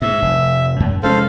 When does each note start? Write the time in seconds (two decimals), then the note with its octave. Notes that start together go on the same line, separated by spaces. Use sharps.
0.02 G#2 E5
0.22 F1
0.80 F#2
1.03 F1 G#3 C#4 A4 C5 F5